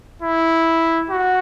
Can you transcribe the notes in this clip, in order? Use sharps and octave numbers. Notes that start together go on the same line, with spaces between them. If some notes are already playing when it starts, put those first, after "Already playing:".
E4
F#4